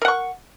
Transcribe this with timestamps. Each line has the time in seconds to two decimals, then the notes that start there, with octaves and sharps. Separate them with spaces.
0.02 A#4
0.05 F#5
0.08 C#6